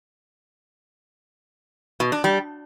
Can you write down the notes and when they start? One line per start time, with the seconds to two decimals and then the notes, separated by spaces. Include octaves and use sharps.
2.00 B2
2.12 D4
2.24 G3